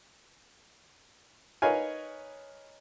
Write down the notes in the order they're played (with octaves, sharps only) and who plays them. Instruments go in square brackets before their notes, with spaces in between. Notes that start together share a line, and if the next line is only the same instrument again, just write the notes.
[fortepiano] D#4 A#4 B4 C#5 F5 G#5